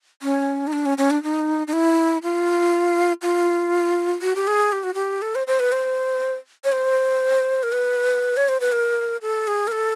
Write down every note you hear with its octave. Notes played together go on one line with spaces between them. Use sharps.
C#4
D#4
D4
C#4
C#4
D4
D#4
D#4
E4
F4
F4
F#4
G4
G#4
G4
F#4
G4
A4
C5
C5
B4
C5
C#5
C5
A#4
B4
C#5
C5
B4
A#4
A4
G#4
A#4
A4